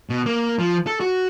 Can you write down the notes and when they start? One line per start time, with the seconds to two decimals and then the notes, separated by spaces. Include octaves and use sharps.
0.10 B2
0.26 A#3
0.59 F3
0.87 A4
1.00 F#4